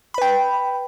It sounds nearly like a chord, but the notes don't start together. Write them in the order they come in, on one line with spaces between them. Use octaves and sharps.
B5 B4 G5